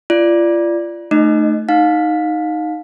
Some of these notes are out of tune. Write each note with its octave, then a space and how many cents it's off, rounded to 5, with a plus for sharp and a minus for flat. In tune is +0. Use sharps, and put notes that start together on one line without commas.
F4 -35 D5 +0
A3 +0 D#4 -30 D#5 +0
D#4 +0 F5 +30